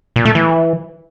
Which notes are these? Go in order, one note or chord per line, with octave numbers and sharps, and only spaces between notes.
A#2
A3
E3